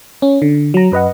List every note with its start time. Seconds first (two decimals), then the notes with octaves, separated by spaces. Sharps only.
0.22 C#4
0.42 D3
0.74 F#3 A#5
0.92 F#2 B4 D#5 F#5